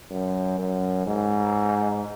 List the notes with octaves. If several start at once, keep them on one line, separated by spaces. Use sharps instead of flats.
F#2
F#2
G#2